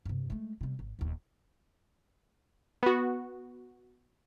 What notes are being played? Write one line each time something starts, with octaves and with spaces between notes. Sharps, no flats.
G2 C3
G#3 A3
C3 G3
G#1
D#1 D#2
B3 F#4